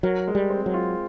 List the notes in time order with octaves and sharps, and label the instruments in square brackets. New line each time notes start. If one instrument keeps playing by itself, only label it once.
[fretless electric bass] F#3 [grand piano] A#4
[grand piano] G#3
[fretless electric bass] G3
[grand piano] C4
[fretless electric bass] F#3
[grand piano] F4